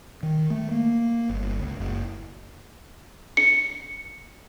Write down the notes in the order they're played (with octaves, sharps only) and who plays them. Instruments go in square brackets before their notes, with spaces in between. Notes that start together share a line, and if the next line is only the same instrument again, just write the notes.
[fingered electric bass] D#3
A3
A#3
G1
C#2
F#1
[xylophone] C#7